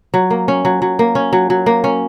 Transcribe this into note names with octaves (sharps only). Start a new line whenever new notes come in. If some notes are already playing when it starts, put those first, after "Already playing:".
F#3
A#3
C#4
F#3
F#3
A#3
C#4
F#3
F#3
A#3
C#4